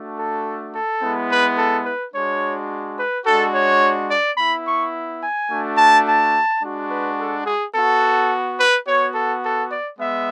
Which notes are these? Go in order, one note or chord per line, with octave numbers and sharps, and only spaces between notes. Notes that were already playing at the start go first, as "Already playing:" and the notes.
Already playing: A3 D4 F#4
A4
A4
G#3 B3 E4
B4
A4
B4
G#3 D4 F#4 C#5
B4
G#3 D4 F#4 A4
C#5
D5
B3 E4 B5
C#6
G#5
A3 D4 F#4
A5
A5
G#3 D4 F#4
B4
A4
G#4
B3 F#4 A4
B4
B3 F#4 C#5
A4
A4
D5
G#3 B3 E5